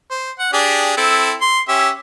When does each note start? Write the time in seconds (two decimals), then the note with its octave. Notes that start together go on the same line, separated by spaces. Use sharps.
0.11 C5
0.39 F#5
0.53 D4 G4 G#4
0.97 C4 E4 A4
1.41 C6
1.69 C#4 G4 E5